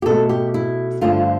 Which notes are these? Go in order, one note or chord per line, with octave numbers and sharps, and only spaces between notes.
G4
B2 A4
A3
G4
E4
G2 D3 F3 A3 F4